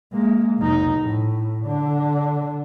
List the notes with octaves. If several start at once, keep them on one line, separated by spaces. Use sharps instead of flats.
G#3 A#3
F1 D#4
A2
D3 D4